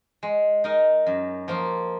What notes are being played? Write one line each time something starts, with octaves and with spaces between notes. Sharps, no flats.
G#3
D#4 A#4 D#5
F#2
F3 A#3 F4